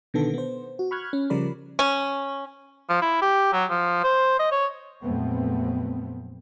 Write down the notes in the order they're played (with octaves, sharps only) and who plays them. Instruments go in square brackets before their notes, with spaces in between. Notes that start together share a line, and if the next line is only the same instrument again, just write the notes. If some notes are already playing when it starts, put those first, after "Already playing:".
[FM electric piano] B2 D3 D#3 B3 A4
B3 C5
F#4
B5 C#6 F6 F#6 G#6
C#4
C#3 F3 G3 A#4 D5 B5
[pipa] C#4
[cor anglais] F3
E4
G4
F#3
F3
C5
D#5
C#5
[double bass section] A#1 F2 F#3 A3 B3 C4